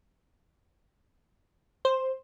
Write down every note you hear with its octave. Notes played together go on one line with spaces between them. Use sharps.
C5